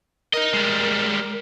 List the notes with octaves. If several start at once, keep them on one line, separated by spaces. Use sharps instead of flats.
D#4 A#4 D#5
G3 G#3